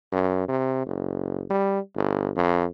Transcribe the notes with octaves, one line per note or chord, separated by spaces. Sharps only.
F#2
C3
F#1
G3
G1
F2